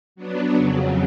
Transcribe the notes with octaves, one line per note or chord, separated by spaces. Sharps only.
F#3 B3 D4
F2 C#3 F#3